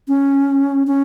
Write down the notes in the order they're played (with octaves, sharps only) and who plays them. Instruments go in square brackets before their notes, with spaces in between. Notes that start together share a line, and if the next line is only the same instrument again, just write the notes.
[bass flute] C#4
C#4